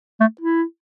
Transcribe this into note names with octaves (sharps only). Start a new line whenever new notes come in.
A3
E4